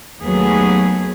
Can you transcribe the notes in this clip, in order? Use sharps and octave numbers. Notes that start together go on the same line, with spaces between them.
D#2 F#3 A3 B3 G#4